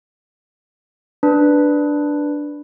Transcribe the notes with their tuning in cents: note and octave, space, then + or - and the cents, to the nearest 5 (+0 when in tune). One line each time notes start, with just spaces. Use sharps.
D4 +0 B4 +0